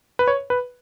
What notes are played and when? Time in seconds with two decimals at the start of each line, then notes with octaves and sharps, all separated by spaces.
0.19 B4
0.28 C#5
0.50 B4